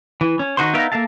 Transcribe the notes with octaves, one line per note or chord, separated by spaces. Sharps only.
E3
C#4
D#3 D#4 F#4 C5 C6
B3 D#4 A#4 E5 F5
A#3 A4 E5 F5 A5